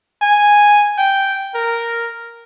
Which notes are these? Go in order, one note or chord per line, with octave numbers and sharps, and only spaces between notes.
G#5
G5
A#4